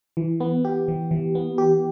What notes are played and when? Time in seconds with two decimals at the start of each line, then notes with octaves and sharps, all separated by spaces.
0.17 E3
0.40 B3
0.65 G4
0.88 E3
1.11 E3
1.35 B3
1.58 G4